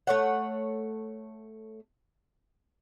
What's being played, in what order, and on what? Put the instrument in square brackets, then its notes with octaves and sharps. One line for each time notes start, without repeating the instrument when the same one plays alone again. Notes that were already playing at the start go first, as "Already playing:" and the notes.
[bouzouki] A3 C#5 F#5